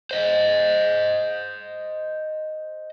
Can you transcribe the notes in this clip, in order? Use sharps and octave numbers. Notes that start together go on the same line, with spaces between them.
C5 D#5